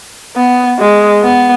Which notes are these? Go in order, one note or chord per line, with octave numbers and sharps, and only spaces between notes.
B3
G#3
B3